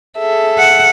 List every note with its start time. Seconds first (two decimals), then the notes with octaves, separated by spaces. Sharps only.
0.18 G#4 A4 E5
0.58 F#5